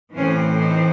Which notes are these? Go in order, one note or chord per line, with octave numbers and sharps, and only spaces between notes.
A2 E3 C4 C#4
D#4